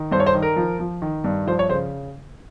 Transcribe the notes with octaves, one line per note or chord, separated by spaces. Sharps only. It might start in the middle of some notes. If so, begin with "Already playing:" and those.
Already playing: D#3
G2 C5
C#5
C5
D#3
A#4
F3
F3
D#3
G2
F3 C5
C#5
C#3 C5